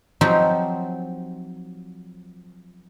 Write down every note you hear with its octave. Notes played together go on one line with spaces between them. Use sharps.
F3 F#3 C4 D#4 F4 G4